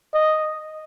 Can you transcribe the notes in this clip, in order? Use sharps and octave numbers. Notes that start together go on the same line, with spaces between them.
D#5